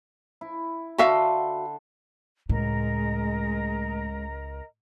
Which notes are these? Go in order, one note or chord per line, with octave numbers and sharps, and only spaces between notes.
E4
D3 F#4 A4 E5 F5 C6
C#2 A2 G#3 A#4 D#5 A#5